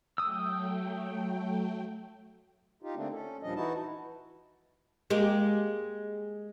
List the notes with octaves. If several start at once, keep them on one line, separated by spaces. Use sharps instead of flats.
F#3 A3 G5 D#6 E6
D#4 F4 G4
D3 A3 A#3 C4 D4
C#4 A4
D#2 A#2 F3 G3 D4 D#5
E3 D#4 E4 F#4 A5
G#3 A#3 G4